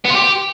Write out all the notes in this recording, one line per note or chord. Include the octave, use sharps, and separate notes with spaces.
B3
F4
G4